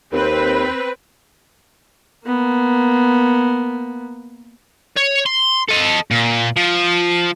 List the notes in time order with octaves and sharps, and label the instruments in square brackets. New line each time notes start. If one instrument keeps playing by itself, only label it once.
[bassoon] D#2 [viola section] C4 B4
[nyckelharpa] A#3 B3
[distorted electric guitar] C#5
C6
A4 D#5
A#2
F3